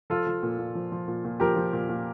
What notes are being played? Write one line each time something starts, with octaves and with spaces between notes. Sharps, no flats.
F3 F4 A4
F3
A#2
A#2
F3
F3
A#2
A#2
F3 G4 A#4
F3
A#2
A#2